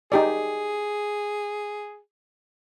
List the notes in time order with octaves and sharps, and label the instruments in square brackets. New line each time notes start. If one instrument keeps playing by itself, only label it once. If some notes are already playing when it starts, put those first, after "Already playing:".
[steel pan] D#4 G4 D5 [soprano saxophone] G#4